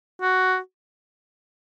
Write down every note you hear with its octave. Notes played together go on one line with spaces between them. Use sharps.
F#4